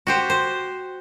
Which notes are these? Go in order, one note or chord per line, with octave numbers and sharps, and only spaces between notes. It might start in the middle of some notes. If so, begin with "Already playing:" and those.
F#4 G4 C5
C5